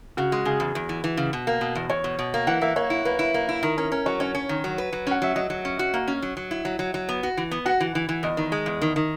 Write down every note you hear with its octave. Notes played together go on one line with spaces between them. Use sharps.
C#3 F#4
G#3
C#3 G#4
E2
E2
E3
E3
C#3
B2
A#3
B2
E2
E2 C#5
B2
B2
A#3
E3 F#5
A#3 E5
A#3 C#5
E4
A#3 B4
E4
A#3
E4
D#3 A#4
C#4 A#4
C#4 A#4
F#3 C#5
C#4 C#5
C#4
D#3
F#3
B4
F#3
C#4 F#5
F#3 E5
F#3 D#5
F#3
C#4
F#4
A#3
C#4
F#3
F#3
E4
F#3
F#3
F#3
B3
F#4
E3
B3
F#4 F#5
E3
E3
E3
E2 D#5
D#3
G#3
E2
D#3
D#3